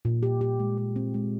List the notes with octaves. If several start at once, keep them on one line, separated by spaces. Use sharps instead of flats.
A#2
G4
G4
G#3
G4
C4
G#3